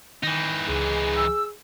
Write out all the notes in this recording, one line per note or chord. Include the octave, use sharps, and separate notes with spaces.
D#3 E3 D#4
C#2 G#4
E6